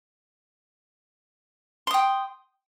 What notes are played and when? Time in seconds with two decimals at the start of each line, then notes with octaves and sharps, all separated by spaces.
1.87 C6
1.91 D#6
1.94 G5